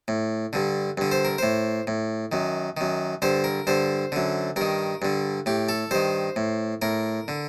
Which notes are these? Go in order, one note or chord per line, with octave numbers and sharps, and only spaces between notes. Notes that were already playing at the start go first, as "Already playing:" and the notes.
A2
G2 D3
G2 D3
C5
A#4
A2 C5
A2
F#2 D#3
F#2 D#3
G2 D3 C5
A#4
G2 D3 C5
F#2 D3
G2 D#3 A#4
G2 D3
A2 G4
A4
G2 D#3 C5
A2
A2 A#4
D3